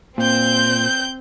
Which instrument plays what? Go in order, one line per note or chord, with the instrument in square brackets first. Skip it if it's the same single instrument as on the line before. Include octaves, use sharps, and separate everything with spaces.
[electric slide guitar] A#2 [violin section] C4 G6